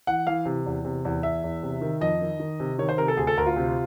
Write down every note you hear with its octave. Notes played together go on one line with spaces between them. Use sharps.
E3 F#5
E3 F5
C3
E2
C3
E2
E2 E5
E2
C3
D#3
F2 D#5
D#3
D#3
C3
D#3 C#5
C5
C3 A#4
A4
D2 G#4
A4
D2 A#4
F4
C3